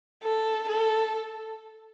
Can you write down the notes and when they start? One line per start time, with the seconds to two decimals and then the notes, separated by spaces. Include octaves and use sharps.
0.23 A4
0.69 A4